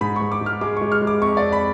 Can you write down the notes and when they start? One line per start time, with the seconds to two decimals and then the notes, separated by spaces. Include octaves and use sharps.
0.01 G#2 B5
0.16 G#2 C#6
0.32 D6
0.41 G#2
0.46 F6
0.61 G#3 D6
0.77 G#3 C#6
0.92 F6
1.02 G#3
1.07 D6
1.22 F2 C#6
1.37 F2 D5
1.53 B5